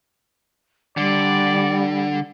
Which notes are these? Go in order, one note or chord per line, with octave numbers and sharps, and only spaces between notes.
D3 G3 D5